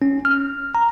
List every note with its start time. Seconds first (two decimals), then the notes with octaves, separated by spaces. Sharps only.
0.02 C#4
0.25 F6
0.75 A#5